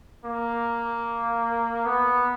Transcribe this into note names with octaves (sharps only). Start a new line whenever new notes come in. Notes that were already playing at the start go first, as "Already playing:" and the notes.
A#3
B3